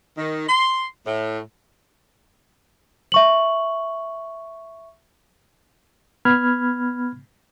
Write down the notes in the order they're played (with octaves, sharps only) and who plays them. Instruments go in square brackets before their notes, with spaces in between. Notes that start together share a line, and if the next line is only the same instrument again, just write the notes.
[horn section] D#3
C6
A2
[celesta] E5 C#6 F#7
[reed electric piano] B3 B5 F6 G#6